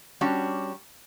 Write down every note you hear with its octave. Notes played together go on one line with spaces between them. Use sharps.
G3 C#4 D4 F#4